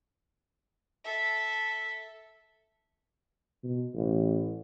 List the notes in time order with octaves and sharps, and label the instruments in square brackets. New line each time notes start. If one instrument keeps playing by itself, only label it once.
[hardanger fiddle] A4 E5
[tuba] B2
A1